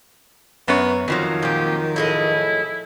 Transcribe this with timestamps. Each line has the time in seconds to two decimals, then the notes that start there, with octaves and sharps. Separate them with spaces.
0.68 F#2 B3 C#5
1.08 F2 D#3 F3 F#3
1.43 A#2 C4 G4
1.96 A2 E4 G#4 D#5